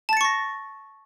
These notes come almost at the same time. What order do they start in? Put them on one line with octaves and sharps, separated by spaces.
A5 A6 C#7 C#6 A#6